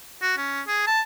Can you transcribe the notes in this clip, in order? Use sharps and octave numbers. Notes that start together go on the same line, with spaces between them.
F#4
C#4
G#4
A5